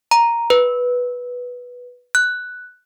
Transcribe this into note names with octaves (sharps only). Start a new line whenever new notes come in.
A#5
B4
F#6